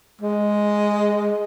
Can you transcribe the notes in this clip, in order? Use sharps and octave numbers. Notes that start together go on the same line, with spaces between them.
G#3